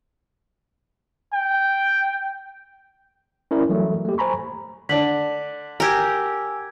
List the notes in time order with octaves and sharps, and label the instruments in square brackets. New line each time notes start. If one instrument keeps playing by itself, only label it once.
[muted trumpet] G5
[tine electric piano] C#4 E4 A#4 C#5 D5
E3 F#3 G3 A3
A3 A#3 G4
C5 G#5 A#5 B5 C#6
[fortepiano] D3 D4 [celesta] B6 F#7
[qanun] G4 A#4 [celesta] G#5 E6 G#6